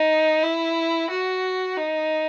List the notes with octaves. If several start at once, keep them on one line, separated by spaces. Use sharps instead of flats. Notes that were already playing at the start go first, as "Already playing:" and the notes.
Already playing: D#4
E4
F#4
D#4